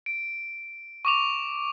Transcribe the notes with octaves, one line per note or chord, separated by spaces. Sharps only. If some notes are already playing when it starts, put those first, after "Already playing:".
D7
C#6 D6 F7